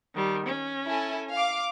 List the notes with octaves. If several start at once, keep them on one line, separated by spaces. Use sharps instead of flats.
D#3 G3
C#4
E4 A4 G#5
F5 D6